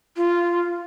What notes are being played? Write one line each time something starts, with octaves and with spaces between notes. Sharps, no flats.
F4